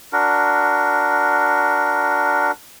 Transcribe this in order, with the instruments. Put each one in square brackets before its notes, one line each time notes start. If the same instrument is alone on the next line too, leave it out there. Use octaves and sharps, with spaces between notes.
[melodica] D4 F#4 A#4